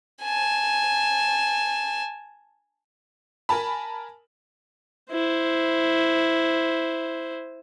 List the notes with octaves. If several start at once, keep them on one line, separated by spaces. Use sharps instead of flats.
G#5 A5
A#4 G#5 A5 B5
E4 C5